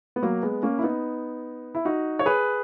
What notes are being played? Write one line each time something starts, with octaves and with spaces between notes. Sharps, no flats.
B3
F#3 A#3
G#3 B3
A#3 C#4
E4
B3 D#4
E4
D#4 F#4
C#5
G#4 B4